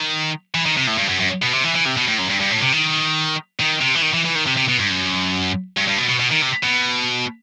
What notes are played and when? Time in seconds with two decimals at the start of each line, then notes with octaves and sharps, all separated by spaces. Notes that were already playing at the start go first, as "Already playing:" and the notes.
Already playing: D#3
0.55 E3
0.66 D#3
0.77 C3
0.87 A2
0.98 G2
1.09 F#2
1.21 F#2
1.42 B2
1.53 C3
1.64 E3
1.75 E3
1.85 C3
1.97 B2
2.08 A2
2.18 F#2
2.30 G2
2.40 G2
2.51 A2
2.62 C3
2.73 D#3
3.60 D#3
3.81 C3
3.95 E3
4.02 D#3
4.14 E3
4.25 E3
4.35 D#3
4.47 C3
4.57 C3
4.68 B2
4.79 G2
4.90 F#2
5.77 G2
5.88 G2
5.98 B2
6.09 B2
6.19 B2
6.31 D#3
6.42 C3
6.63 B2